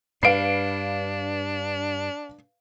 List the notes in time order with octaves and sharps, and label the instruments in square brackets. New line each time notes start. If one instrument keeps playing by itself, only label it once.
[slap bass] G2 [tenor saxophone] D4 [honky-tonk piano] B4 F5 [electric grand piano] C7 D7